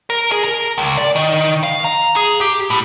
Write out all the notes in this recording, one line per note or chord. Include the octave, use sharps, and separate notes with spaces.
A#4
G#4
A#4
C#2
D5
D#3
F5
A#5
G#4
G4
A2